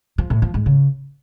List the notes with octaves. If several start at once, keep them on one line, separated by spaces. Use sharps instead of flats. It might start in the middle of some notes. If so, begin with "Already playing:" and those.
F3
A2
F3
G#2
C#3